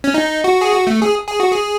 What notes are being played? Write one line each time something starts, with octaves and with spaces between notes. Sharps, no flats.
C#4
D#4
F#4
G#4
F#4
A3
G#4
G#4
F#4
G#4